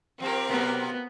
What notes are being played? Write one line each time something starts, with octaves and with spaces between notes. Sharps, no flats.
F3 A#3 C4 G4 A#4
B2 F#3 A#3 B3